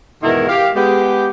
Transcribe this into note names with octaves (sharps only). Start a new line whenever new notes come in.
E2 G#2 B2 D#3 E4 A#4
G4 F5
G#3 B3 G4